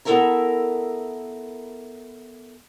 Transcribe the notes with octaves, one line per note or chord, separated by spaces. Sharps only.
B3 E4 A4 A#4 E5 A#5